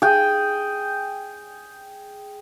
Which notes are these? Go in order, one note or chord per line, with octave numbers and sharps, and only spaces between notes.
G#4 G5